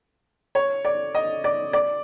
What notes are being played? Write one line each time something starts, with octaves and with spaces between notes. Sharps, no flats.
C#5
D5
D#5
D5
D5